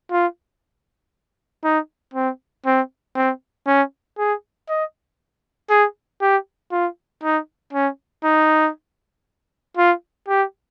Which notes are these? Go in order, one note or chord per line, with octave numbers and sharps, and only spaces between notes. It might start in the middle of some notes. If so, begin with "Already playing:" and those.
F4
D#4
C4
C4
C4
C#4
G#4
D#5
G#4
G4
F4
D#4
C#4
D#4
F4
G4